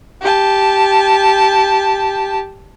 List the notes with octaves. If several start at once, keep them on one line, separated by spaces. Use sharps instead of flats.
G4 A5